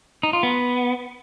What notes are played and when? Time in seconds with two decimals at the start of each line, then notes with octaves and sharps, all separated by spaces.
0.23 D#4
0.33 F4
0.43 B3